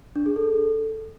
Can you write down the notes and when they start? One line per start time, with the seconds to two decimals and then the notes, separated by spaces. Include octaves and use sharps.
0.16 D4
0.26 G#4
0.36 A4